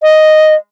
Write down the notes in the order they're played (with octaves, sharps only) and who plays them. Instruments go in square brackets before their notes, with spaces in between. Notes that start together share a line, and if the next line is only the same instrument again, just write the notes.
[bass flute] D#5